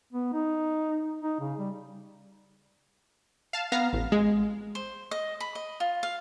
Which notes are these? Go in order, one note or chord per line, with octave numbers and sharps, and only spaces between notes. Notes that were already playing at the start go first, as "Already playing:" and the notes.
B3
D#4
D#4
C#3
G3
F5 A5
B3 F5 A#5
A1
G#3
C5
D#5
B5
D#5
F4
F5